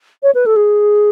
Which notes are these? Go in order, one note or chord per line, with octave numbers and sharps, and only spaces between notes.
C#5
B4
A4
G#4